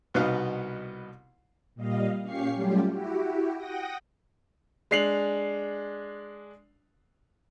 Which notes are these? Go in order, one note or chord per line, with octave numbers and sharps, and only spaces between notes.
C2 B2 B3 D#4 F5 F#6
A#2 G3 D#5 F5
A#2 C#4 G4 F5 C#6 C7
F#3 G3 A3 C#4 F4 G4
E4 F#4 G4
F#5 G5 D#6 A#6
G#3 D4 C7 F7 F#7